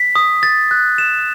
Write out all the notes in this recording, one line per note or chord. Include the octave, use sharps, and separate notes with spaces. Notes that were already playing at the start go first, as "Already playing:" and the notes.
Already playing: B6
D#6
A6
F#6
E7